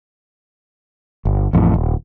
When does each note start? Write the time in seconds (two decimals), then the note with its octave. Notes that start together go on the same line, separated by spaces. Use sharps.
1.25 G1
1.53 A1 F2 A2
1.74 D#1